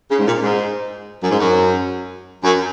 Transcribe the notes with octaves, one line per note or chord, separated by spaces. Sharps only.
C#3
G#2
A#2
G#2
F#2
G#2
F#2
F#2